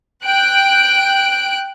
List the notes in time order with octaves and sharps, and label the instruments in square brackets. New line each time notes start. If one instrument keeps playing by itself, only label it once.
[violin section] G5 F#6 D7